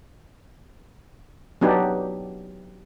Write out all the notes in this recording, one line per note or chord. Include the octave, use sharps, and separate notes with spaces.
F#3 B3 D4 D#4 G4